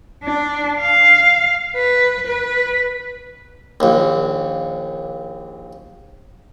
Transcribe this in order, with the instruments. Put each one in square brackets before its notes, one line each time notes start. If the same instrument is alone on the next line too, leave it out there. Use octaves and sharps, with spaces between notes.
[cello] D4
F5
B4
B4
[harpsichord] A#1 D#2